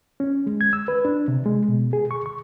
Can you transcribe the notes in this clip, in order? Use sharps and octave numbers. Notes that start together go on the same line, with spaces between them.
C#4
G#3
G#6
E6
B4
D4
C3
G#3
B2
G#4
C#6
C#6